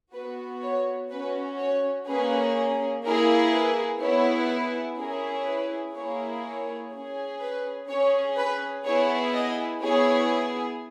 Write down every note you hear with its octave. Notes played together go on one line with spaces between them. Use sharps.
B3 F#4 B4
C#5
C#4 F#4 B4
C#5
A#3 C#4 G#4 B4
A#3 E4 G#4 A#4
B4
B3 E4 G#4 C#5
B4
C#4 E4 G#4 A#4
B4
A#3 E4 G#4 C#5
C#5
C#4 G#4
B4
C#4 G#4 C#5
B4
B3 E4 G#4 C#5
D#5
B3 E4 G#4 C#5